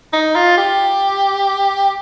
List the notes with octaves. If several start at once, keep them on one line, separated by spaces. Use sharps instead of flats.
D#4
F4
G4